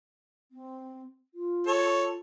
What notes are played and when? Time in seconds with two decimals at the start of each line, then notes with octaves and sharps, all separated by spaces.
0.52 C4
1.34 F4
1.67 A4 C#5